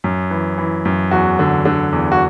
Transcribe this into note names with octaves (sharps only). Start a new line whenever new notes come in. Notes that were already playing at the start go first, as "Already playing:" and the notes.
F#2
E3
E3
F#2
E2 F#4
D3
D3
E2
F#4